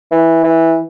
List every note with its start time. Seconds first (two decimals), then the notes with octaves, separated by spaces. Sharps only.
0.12 E3
0.44 E3